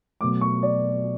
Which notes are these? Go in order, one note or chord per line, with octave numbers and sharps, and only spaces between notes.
B2 F#3 A3 D6
C#6
D5